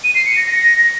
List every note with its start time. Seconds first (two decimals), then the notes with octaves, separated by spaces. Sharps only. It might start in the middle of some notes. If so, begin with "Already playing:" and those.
0.04 D#7
0.15 C7
0.26 C#7
0.37 A#6
0.48 A#6